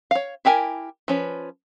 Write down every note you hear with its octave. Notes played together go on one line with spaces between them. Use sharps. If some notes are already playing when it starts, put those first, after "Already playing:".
C#5 F5
E4 G4 A#4 G#5
F3 C#4 B4